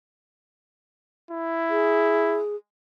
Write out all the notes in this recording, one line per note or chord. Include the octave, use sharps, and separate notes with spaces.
E4
G#4